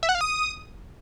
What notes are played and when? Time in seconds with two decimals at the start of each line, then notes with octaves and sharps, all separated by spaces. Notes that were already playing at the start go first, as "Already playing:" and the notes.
0.03 E5
0.09 F#5
0.15 F5
0.21 D#6